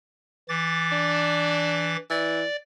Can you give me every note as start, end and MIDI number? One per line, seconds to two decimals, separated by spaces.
0.49 1.96 52
0.49 1.96 86
0.49 1.96 93
0.92 1.99 62
2.10 2.43 52
2.10 2.56 74